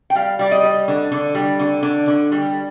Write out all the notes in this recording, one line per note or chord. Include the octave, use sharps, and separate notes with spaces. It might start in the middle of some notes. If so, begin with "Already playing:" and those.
G5
G3 F5
G3 D5
D#5
G3
D3
D3
G3
D3
D3
D3
G3